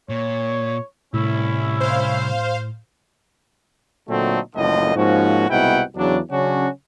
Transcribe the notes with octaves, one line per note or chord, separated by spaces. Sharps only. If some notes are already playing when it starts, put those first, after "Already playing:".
A#2 C#5
C2 A2 C#4 E4
C5 F5
A#2 D3 F#3 A3 C4 D#4
F#1 C#2 A2 D3 F3 D#5
G#2 F3 A#3 C#4 F#4
C2 G#2 B2 E4 F#5 G5
E2 C#3 F#3 D4
C#3 F#3 C#4 D4 F#4